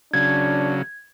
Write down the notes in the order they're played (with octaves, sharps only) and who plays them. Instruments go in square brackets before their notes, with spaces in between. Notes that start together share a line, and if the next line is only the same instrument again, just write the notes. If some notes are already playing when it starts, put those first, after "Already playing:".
[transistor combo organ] C#3 F#3 [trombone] D4 [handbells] G#6